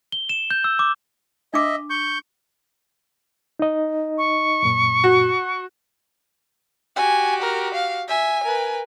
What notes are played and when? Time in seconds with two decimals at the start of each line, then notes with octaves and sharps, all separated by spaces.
0.12 G7
0.29 E7
0.51 G6
0.64 E6
0.79 D6
1.54 D4 D#5 E5 D6
1.90 C#6 G6
3.59 D#4 D#5
4.18 C#6
4.62 F#2 A#2
5.04 F#4
6.96 F#4 G4 G#5
7.42 A#4
7.74 F5
8.08 E5 G#5
8.43 A#4 B4